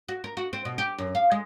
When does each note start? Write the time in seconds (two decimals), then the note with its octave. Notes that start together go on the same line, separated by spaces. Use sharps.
0.09 F#4
0.24 A#4
0.37 F#4
0.53 C4
0.65 B2
0.78 G4
0.98 F#2
1.15 F5
1.32 G#3